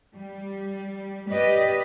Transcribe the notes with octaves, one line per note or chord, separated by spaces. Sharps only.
G3
G4 B4 D5 D#5